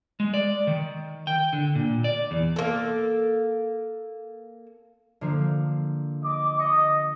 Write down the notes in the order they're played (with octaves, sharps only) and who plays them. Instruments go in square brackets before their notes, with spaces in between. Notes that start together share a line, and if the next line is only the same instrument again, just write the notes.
[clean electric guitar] G#3
D5
D#3
G5
D3
A#2
D5
E2
[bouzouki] A#3 A4
[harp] D3 F3 A#3
[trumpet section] D#5 D6
[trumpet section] D#5 [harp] C#6